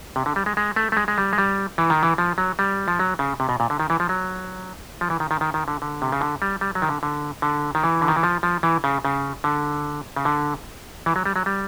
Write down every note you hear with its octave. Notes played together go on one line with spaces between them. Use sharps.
C3
D3
G3
G#3
G#3
A3
A3
G#3
G#3
G3
G#3
G3
E3
D#3
E3
F3
F#3
G3
F3
F#3
C#3
C3
B2
A#2
D3
D#3
E3
F3
F#3
F3
E3
D#3
D#3
D#3
D#3
D3
D3
C3
C#3
D3
G3
G3
F#3
D#3
D3
D3
D3
D#3
E3
D3
D#3
E3
F3
F3
E3
C#3
C#3
D3
C#3
D3
E3
F#3
G3
F#3
G3